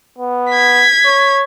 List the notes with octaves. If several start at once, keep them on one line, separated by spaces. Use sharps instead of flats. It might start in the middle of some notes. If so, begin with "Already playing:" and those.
B3
G#6 B6
C#5